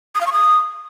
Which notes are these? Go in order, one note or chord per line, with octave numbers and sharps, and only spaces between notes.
D#6
F5
C#6
D#6